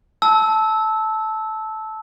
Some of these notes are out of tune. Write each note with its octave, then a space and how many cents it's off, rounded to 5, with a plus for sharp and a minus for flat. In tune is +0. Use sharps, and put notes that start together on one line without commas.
A5 -10 E6 -15